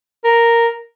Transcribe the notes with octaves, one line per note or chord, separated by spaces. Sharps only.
A#4